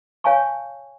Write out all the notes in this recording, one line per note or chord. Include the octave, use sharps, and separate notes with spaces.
C#5 F5 G#5 A5 C#6